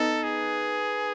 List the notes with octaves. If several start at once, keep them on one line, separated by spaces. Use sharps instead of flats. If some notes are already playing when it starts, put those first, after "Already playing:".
Already playing: B3 D#4 A4
G#4